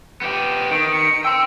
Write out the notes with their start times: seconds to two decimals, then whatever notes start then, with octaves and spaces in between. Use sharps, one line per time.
0.21 B3 G4
0.71 D#3 D7
0.92 C#7
1.24 G5 C6 E6